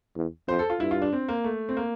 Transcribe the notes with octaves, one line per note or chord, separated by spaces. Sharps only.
E2
F2 C5
A4
F4
G2 E4
F4
D4
C4
A#3
A3
C4
A#3